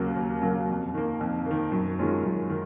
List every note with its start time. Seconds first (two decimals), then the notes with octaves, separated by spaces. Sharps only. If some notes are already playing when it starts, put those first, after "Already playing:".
Already playing: D#2 C#3 F#3 A#3
0.16 D#2
0.42 C#3 F#3 A#3
0.69 F2
0.94 D#3 A#3
1.21 F2
1.46 D#3 A#3
1.72 F#2
1.98 D#3 G#3 C#4 F4
2.24 F#2
2.50 D#3